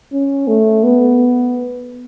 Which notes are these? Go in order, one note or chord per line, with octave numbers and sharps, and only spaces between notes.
C#4
A3
B3